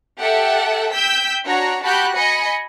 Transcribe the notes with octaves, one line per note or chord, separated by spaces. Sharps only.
G4 A4 E5 F#5 G5
G5 E6 G6 B6
D4 F#4 C#5 A#5
F#4 G4 A5 B5 F#6 G6
D#5 G#5 B5 C#7